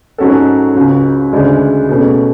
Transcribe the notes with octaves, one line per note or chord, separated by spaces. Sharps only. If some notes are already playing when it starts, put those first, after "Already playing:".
G#2 F#3 C#4 F#4 A4
C#2 C#3 F#3
D2 C#3 G#3 D4
B2 A3 C#4 G#4